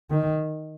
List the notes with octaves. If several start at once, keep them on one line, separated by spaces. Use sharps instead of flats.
D#3